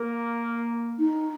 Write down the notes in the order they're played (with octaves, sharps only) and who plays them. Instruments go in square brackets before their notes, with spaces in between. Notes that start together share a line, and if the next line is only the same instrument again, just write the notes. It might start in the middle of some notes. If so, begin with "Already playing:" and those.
Already playing: [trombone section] A#3
[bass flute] D#4